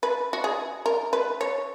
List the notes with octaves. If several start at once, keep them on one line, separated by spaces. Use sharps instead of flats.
B4
F#4
G#4
A#4
B4
C#5